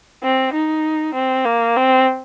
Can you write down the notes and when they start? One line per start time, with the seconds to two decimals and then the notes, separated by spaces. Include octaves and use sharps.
0.23 C4
0.53 D#4
1.14 C4
1.45 A#3
1.76 C4